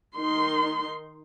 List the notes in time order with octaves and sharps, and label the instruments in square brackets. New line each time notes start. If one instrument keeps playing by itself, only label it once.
[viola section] D#3 D#4 C6